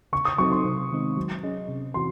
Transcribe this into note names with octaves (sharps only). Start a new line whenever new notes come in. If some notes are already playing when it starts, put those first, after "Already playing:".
C#3 C#6
D#6
F#3 C4 D#4 A4 C#6
C6
C3
D#3 G#3 C4 D#4
F#3
C#4 G#4 D#5
C3
E3 C4 F#4 C6